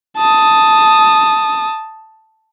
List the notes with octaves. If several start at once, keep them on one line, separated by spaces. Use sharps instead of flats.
A5 D#6